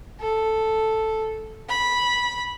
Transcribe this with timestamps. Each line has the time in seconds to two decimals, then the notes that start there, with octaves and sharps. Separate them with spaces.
0.20 A4
1.69 B5